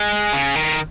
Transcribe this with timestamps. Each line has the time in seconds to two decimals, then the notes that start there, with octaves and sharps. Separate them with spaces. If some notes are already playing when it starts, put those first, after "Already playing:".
Already playing: G#3
0.33 C#3
0.55 D#3